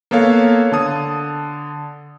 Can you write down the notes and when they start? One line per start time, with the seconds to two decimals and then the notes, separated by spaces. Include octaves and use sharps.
0.11 A#3 B3 A4 C#5 F5
0.72 D3 A5 D#6